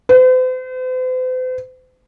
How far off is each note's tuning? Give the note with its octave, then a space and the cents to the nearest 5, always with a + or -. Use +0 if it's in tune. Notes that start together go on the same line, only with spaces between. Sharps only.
C5 -45